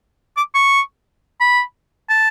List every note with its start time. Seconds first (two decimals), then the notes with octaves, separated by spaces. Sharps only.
0.37 D6
0.55 C#6
1.40 B5
2.09 A5